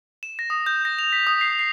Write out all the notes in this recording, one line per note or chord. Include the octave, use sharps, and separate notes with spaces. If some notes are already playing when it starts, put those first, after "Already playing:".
E7
A#6
D#6
G6
A#6
F7
B6
D#6
C7
C7